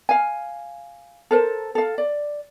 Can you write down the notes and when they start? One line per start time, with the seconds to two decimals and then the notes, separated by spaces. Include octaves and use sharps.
0.09 F5 G#5
1.31 A4 A#4 C5
1.75 A4 F5
1.98 D5